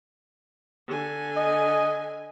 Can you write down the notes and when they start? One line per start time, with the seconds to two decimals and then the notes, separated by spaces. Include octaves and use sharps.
0.88 D3 G#5
1.37 D#5